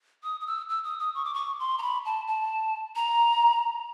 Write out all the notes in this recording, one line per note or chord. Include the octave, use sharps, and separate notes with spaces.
D#6
D#6
E6
E6
D#6
D#6
C#6
D6
C#6
C6
A#5
B5
A5
A5
A#5